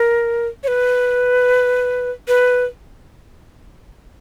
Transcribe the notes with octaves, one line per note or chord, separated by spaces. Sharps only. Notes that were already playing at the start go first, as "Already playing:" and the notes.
Already playing: A#4
C#5
B4
B4